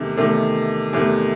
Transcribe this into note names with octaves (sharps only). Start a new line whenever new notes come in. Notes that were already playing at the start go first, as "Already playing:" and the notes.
Already playing: E2 C3 D#3 A3
E2 C3 D#3 A3
E2 C3 D#3 A3